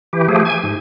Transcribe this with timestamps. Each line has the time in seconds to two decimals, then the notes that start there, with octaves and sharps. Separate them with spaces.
0.13 E3 G4
0.28 F3 A3 G4 G#4
0.45 G#5
0.63 G#2